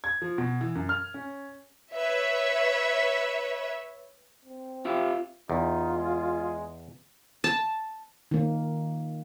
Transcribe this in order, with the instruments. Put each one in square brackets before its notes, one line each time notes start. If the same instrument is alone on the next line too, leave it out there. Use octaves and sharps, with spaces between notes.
[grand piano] G#6
F3
B2
E3
F#2
F6
C#4
[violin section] B4 C#5 E5
[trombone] C4
[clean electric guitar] F4 G4 E5
[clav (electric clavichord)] E2 [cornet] D#4 [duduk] F4
[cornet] G#3
[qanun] A5
[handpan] D#3 A#3